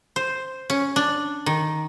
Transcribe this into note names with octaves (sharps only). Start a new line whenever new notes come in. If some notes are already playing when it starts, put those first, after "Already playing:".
C5
C#4
D4
D#3